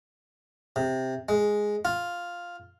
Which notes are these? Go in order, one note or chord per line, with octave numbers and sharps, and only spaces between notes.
C3
G#3
F4